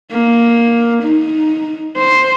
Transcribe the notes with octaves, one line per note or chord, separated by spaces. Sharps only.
A#3
D#4
C5